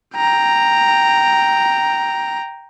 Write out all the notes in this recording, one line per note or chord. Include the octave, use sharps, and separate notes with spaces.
G5 A#5